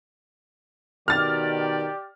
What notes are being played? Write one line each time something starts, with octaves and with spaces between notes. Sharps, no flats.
B2 D#3 G4 D5 F6 A6